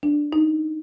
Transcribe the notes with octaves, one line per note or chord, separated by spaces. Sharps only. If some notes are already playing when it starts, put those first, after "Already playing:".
D4
D#4